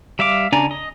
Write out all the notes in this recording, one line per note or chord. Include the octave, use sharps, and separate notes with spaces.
G3 E5 F5 D6
C#3 D4 D5 G#5 A#5
D#5